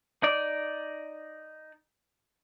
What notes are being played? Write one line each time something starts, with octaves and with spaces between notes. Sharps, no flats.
D#4 D5